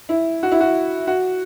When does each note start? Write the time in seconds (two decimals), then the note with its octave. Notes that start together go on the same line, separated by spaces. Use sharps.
0.09 E4
0.43 F#4
0.52 E4
0.60 F#4
1.07 F#4